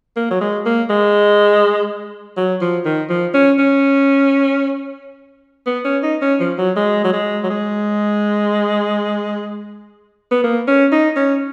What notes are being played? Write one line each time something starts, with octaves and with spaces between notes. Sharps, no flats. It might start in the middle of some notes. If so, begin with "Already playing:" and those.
A#3
F#3
G#3
A#3
G#3
F#3
F3
D#3
F3
C#4
C#4
B3
C#4
D#4
C#4
F3
F#3
G#3
F#3
G#3
F#3
G#3
B3
A#3
C#4
D#4
C#4